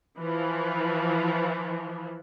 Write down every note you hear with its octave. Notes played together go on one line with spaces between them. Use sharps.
E3 F3